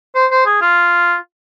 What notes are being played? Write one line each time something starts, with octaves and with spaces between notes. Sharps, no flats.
C5
C5
G#4
F4